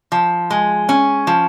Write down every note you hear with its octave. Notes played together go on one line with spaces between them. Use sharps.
F3
G#3
C#4
F3